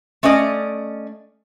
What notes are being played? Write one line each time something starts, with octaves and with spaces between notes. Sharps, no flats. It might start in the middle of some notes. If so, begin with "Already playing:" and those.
A3 C#4 D5 D#5